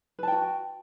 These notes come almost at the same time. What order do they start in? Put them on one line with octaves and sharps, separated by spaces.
B4 A5 G5 F#4